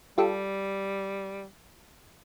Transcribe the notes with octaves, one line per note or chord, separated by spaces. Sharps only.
G3 F4 G4 A4